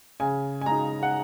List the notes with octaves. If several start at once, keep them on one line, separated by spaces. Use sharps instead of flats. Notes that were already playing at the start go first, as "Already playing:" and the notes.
C#3 G#5
G#5
G#3 D#4 A#5
F#5